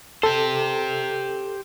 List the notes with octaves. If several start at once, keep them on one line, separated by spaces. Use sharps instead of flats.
G4 A4 C5